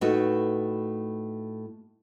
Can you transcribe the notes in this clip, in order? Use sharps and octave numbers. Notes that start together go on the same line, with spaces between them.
A2 A3 D#4 F#4 B4